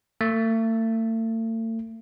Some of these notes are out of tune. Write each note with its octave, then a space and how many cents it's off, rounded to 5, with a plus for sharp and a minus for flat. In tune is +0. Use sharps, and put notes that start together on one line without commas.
A3 +40